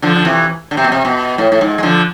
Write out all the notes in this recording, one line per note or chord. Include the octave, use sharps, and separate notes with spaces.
D3 F3
D3
C3 E3
D3
C3
B2
C3
B2
A2
A2
G#2
G#3
D3 F3